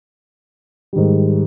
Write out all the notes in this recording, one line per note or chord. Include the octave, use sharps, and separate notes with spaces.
G#2 D#3 G3